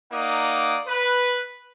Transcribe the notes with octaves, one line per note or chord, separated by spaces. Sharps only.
A#3 D#4 D5 F#5 D6 D#6
B4